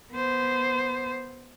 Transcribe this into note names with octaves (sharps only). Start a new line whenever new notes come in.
B3 C5